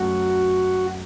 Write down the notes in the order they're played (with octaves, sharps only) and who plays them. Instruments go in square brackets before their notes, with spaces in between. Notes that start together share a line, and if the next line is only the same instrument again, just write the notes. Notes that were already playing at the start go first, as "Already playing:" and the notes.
Already playing: [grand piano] F#2 F#3 A3 [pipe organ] F#4